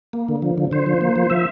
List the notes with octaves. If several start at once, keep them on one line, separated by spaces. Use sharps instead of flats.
A#3
D3
F3
D3
D3 C5
F3
A#3
F3
F3 E5